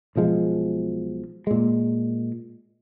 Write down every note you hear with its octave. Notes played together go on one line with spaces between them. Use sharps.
B1 B2 F3 G#3
A#2 G#3